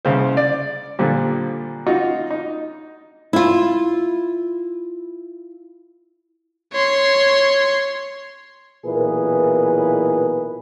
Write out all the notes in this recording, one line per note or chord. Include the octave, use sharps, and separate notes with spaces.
C2 C#3 C5
D5
A#2 D3 F3 G3
D#4 F4 F#4
D#4
E4 F4
C#5 C6
B1 A#2 E3 G#4 A#4 B4